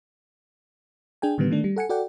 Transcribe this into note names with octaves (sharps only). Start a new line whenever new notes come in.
D4 G#4 G5 G#5
A2 D3 D#3 G3 B3
D#3 A3 D4
G3
A4 F#5 G#5 C#7
F#4 A4 D5 F#5 G5